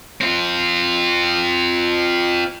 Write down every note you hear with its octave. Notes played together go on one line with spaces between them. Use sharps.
C4 F4